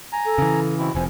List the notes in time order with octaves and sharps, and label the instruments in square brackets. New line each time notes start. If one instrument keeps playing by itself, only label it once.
[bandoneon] G#5 A#5
[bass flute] A4
[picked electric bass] C#3 E3
[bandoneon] B2 C4 E4
[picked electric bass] F1 F2 [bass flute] C5 [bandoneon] G#5